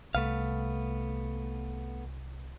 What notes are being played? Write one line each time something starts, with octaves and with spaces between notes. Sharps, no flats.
C2 A3 B3 F5